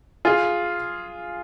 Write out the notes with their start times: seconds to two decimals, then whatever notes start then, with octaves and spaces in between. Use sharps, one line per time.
0.25 F4 G#4